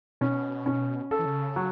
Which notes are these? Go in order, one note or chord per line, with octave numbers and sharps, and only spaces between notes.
B2 C#4
C#4
C#3 A4
E3
C#3
F#3